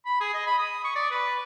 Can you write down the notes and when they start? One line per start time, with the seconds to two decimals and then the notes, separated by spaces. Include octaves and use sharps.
0.05 B5
0.21 G#4
0.34 D#5
0.47 B5
0.59 D#6
0.84 C#6
0.96 D5
1.11 B4